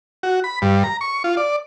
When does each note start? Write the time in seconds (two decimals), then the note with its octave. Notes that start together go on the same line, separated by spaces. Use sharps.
0.23 F#4
0.44 B5
0.62 G2
0.84 A#5
1.01 C#6
1.24 F4
1.37 D5